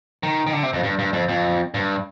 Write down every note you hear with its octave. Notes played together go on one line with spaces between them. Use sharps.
D#3
D#3
D3
C3
F2
G2
G2
F2
F2
G2